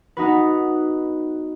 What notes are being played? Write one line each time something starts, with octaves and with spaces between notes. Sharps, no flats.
B3 D#4 F#4 B4